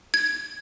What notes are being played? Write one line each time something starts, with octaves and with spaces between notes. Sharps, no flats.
G#6